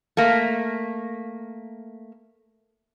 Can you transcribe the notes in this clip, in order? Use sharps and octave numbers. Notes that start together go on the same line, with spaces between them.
A3 A#3